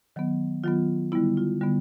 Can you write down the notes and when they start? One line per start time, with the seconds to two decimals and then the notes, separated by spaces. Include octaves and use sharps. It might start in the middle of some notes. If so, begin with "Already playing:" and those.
0.16 D#3 F#3 B3
0.64 D#3 F#3 B3 F4
1.12 D3 G3 B3 E4
1.37 F4
1.61 D3 G3 B3